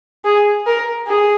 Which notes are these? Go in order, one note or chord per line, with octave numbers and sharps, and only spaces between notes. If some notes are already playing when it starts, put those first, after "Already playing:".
G#4
A#4
G#4